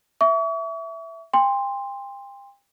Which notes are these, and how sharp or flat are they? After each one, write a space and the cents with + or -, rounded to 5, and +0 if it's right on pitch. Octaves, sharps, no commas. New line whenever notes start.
E5 +0 C#6 +45
G5 +40 C6 +0